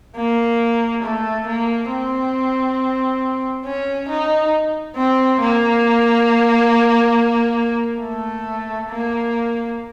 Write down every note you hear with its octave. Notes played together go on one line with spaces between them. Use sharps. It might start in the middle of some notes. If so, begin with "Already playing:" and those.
A#3
A3
A#3
C4
C#4
D#4
C4
A#3
A3
A#3